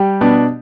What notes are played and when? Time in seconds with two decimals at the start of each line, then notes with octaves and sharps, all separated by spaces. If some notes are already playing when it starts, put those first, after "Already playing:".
Already playing: G3 G4
0.21 B2 B3 D4